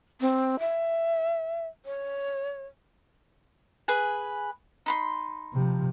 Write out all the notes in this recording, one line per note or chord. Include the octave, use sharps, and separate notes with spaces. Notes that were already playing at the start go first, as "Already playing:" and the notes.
C4
E5
C#5
G#4 B4 G#5
D#4 B5 C6
C3 F3